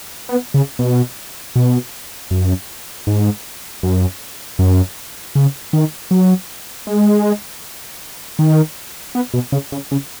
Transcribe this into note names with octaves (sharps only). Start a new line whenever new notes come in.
B3
C#3
B2
B2
F#2
G#2
F#2
F#2
C#3
D#3
F#3
G#3
D#3
B3
B2
C#3
C#3
C#3